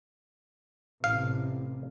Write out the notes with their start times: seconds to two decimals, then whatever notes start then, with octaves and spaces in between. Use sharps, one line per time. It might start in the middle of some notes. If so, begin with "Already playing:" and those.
1.04 A1 A2 C3 F5